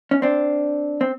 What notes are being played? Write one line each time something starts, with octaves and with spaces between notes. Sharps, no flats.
C#4
C4 D4
C4